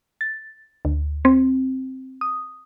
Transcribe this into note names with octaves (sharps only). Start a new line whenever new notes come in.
A6
D2
C4
D#6